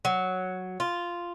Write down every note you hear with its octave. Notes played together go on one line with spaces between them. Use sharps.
F#3
F4